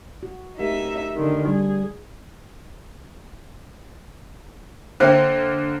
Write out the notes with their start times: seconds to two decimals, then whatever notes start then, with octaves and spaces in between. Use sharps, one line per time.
0.23 F#4
0.59 A3 D#4 G4 A#4 E5
1.15 D3 D#3
1.48 G3 G#4
5.00 D3 A#3 C5 E5 G5